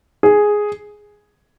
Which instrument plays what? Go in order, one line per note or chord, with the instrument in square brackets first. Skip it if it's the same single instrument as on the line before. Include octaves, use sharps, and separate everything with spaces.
[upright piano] G#4